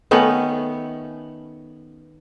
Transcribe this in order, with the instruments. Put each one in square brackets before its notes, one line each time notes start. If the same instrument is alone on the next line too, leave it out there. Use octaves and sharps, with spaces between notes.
[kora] D#3 A3 B3 C#4